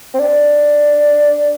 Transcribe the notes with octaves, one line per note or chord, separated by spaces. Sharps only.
C4
D4